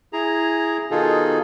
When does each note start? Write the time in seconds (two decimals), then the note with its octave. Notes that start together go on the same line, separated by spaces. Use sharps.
0.13 E4 G#4 A#5
0.91 B2 D#3 D#4 F4 G#4 A4